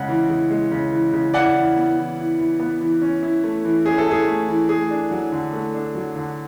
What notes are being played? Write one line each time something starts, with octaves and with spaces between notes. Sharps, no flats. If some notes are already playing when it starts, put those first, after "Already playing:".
Already playing: C#3 G#3 F#5
E3
C#3
G#3
C#3
E3
C#3
E4 D5 F#5
E3
B3
E3
E4
E3
B3
E3
C#4
E4
A3
E3
C#4 G#4
A4
E4 G#4
A3
E3
A3 G#4
D4
F#3
D3
A3
D4
F#3
D3